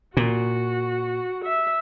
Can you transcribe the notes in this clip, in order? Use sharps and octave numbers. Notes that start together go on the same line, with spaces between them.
A#2 F#4
E5